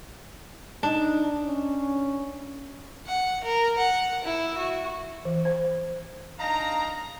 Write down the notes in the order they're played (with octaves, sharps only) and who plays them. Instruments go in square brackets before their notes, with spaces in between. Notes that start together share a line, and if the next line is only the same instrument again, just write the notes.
[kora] D4 [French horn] D#4
[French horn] C#4
[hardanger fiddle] F#5
A#4
F#5
E4
F#4
[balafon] E3
C5
[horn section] D4 D#4 F5 A#5